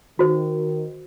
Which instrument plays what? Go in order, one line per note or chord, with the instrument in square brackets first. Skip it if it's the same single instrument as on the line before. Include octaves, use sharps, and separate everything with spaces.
[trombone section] D#3 [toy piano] F#4 C5